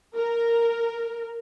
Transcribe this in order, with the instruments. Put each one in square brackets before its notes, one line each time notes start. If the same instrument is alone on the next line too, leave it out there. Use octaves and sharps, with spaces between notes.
[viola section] A#4